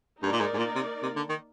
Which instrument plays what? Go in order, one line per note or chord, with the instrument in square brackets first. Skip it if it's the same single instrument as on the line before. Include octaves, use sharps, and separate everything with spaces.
[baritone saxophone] G2 [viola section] A#3 D#4 A#4 D5
[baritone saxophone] A#2
G#2
G#2
A#2
C3
C3
D3
D#3